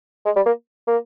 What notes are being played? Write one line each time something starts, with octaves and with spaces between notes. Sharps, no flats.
G#3
G3
A#3
A#3